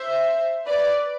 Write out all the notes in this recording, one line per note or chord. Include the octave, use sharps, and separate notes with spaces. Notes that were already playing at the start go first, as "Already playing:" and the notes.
Already playing: C5 E5
B4 D5